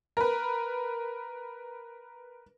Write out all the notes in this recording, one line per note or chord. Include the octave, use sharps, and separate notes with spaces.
A#4 B4